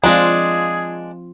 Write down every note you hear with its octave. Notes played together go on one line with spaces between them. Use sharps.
F3 G#3 C4 D4 F4 G#4